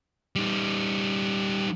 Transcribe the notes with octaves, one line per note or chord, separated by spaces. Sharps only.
G3 D#4